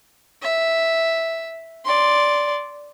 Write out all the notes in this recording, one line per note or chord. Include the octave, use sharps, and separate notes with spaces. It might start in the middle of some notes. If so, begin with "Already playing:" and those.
E5
D5 C6